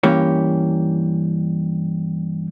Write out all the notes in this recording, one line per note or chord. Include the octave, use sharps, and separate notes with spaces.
G2 E3 A#3 C#4 G4 C#5